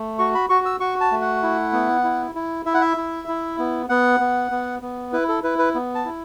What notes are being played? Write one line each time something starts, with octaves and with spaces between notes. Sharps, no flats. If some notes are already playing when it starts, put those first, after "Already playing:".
Already playing: A3
F#4 C#6
B5
F#4 C#6
E6
F#4 C#6
A5
A3
F#5
E4
B3
E4
E4
E4 E5
F#5
E5
E4
E4
B3
B3 F#5
B3
B3
B3
E4 B4
A4
E4 B4
B4
B3
A5
E4